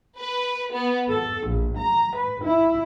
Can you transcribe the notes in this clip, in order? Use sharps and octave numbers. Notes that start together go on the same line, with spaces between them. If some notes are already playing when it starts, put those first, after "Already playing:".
B4
B3
A4
A#1
A#5
B4
E4